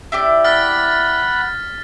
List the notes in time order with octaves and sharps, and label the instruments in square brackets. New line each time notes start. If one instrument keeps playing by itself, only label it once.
[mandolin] E4 G4 D5
[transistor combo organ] F#5 B5 [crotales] F6 A6 B6